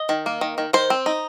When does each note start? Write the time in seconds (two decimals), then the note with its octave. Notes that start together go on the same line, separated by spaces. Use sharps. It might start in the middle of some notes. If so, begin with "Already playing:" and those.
Already playing: D#5
0.09 D#3
0.26 A#3
0.41 D#3
0.58 D#3
0.73 D#3 C5
0.90 C4
1.06 D#4